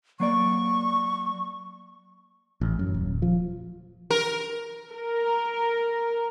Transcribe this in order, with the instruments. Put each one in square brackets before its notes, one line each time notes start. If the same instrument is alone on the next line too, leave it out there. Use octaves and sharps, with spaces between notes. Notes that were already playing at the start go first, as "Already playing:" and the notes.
[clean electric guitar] F#3 A#3 D5 [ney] C#6
[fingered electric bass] A1
F#2
D#1
F3
[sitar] A#4
[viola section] A#4